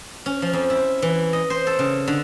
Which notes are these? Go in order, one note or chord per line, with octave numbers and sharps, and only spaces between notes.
C#4
F3
F2
E4
E3
D#5
C5
A4
C#3
D3